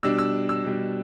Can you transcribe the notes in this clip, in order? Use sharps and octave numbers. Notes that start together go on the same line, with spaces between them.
B2 G3 D4 E6
E6
E6
B2 G3 D4